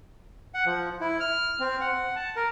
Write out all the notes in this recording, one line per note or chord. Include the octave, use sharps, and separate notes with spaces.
F#5
F3
E4
F6
C4
F#5
A5
A#4